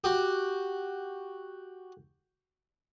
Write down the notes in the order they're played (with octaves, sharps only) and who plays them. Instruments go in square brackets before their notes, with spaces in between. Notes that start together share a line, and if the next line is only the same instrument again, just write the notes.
[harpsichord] F#4 G4